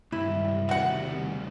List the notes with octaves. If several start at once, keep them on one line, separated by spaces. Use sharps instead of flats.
C#2 G2 C3 D#3 G3 E4
E2 C#3 F#4 F#5